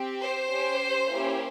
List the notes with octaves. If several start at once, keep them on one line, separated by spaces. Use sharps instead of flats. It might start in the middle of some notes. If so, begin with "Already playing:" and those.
Already playing: C4 G4
C5
C#4 G4
A#3 C#4 E4 G4